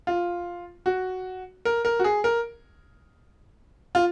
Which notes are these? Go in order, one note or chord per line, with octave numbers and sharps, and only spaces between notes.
F4
F#4
A#4
A#4
F#4
G#4
A#4
F4